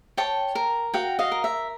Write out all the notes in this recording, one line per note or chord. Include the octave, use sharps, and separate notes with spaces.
C#5 G5 A5
A#4
F#4 F5 G5
D#5 F5
A#4
E5